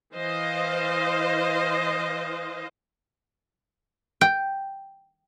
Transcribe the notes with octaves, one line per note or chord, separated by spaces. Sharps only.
E3 C5 D#5 F5
G5